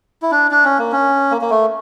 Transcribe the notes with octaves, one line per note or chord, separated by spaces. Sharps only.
E4
D4
D4
C#4
A#3
C#4
A#3
A#3
A3